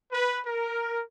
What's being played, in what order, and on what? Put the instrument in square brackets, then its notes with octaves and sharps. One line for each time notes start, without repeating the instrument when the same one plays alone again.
[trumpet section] B4
A#4